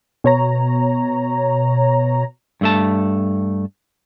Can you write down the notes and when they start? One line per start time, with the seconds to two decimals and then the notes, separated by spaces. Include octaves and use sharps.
0.24 B2 C#5 A#5
2.61 G2 A3 A5